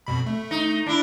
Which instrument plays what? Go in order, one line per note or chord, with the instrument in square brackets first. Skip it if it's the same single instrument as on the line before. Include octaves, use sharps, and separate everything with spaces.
[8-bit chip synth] F2 B2 B5
A3
[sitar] D#4
D4 E4